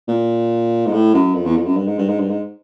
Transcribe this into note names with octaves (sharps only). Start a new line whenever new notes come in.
A#2
G#2
A2
F#2
F2
E2
F2
F#2
G2
G#2
G2
G#2
G2
G#2